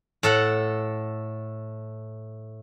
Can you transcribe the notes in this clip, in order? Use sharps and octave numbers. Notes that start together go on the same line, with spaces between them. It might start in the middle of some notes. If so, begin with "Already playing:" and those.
A2 A4 F#5